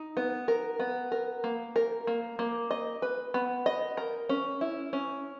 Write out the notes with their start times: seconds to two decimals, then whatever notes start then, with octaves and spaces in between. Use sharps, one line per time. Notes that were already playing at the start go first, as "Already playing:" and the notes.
Already playing: D#4
0.17 B3
0.48 A#4
0.80 B3
1.12 A#4
1.44 A#3
1.76 A#4
2.07 A#3
2.39 A#3
2.71 D#5
3.02 B4
3.34 B3
3.66 D#5
3.97 A#4
4.29 C#4
4.61 E4
4.93 C#4